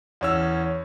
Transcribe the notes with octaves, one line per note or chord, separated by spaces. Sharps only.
E2 C#4 E6